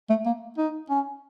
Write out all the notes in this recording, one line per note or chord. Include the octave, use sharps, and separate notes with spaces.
A3
A#3
D#4
C#4